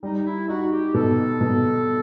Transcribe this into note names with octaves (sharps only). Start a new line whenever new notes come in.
G3 D#4
E4
D#4 F#4
G4
B2 A4
B2